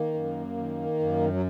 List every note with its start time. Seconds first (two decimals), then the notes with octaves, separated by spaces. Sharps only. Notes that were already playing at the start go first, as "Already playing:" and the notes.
Already playing: D#3 A#3
0.14 F#2
0.57 D#3
0.99 F#2
1.34 F#3